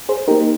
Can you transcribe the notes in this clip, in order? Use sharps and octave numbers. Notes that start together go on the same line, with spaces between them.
G#4 C5
A#3 D#4 G4 A#4